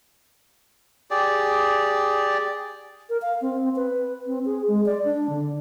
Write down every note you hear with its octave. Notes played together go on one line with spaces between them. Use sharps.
G4 G#4 D5
A#4
F5
C4
B4
C4
G#4
G#3
D5
D4
D3